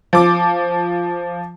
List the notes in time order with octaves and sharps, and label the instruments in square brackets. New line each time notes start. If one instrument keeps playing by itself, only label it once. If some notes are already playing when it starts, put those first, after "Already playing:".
[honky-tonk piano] F3 D6